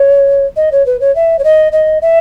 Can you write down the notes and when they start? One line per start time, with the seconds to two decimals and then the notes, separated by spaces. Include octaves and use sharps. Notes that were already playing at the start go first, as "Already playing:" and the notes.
Already playing: C#5
0.56 D#5
0.72 C#5
0.86 B4
1.00 C#5
1.15 E5
1.38 C#5
1.44 D#5
1.72 D#5
2.01 E5